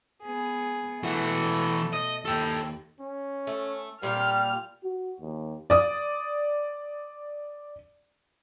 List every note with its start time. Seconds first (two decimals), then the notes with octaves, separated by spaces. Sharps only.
0.23 B3 G#4
1.04 B2 E3 A3 F#4
1.93 D#5
2.25 D#2 A4 G5
3.00 C#4
3.47 A3
4.03 A#2 G3 G4 F6
4.84 F#4
5.21 D#2
5.70 D5 D#6